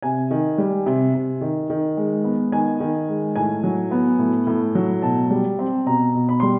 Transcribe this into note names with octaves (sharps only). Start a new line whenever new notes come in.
C3 G#5
D#3
G3
C3
C3
D#3
D#3
G#3
B3
D#3 G#5
D#3
G#3
A2 G#5
F#3
B3
A2
A2
F#3
B2 A5
G3
C4
B2 A#5
B2
B5
G3 C6